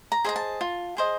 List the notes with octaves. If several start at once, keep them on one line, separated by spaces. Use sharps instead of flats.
A#5
G#4 C5 D#5 A#5
A5
F4
G#4 C5 D#5